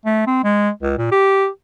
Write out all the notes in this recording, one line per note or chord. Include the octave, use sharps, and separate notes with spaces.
A3
C4
G#3
C#2
A#2
G4